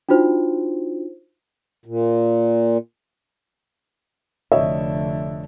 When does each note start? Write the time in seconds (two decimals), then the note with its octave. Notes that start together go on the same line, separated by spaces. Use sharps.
0.09 D4 D#4 F4 F#4 C5
1.86 A#2
4.52 F1 D3 C#5 D#5 E5